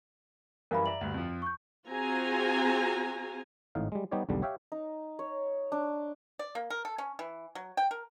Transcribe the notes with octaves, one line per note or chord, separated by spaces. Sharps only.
F#2 E3 G3 A#4 F5 B5
D5 E5 A#5 F#7
D2 G2
F2 F3
C#6 G6
C4 F4 F#4 G#4 G#5 A#5
G#1 A2 D#4 F5
G3 G#3
G3 B3 D#4 G4 C#5 D5
B1 E2 D3 G3
G4 C#5 E5 F5 G5
D#4
C#5
D4
D5
A#3
A#4
A4
C#4
E3
F#3
G5
A#4